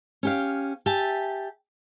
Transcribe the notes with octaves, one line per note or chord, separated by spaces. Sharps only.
C#4 G4 F5
G4 E5 G#5 A5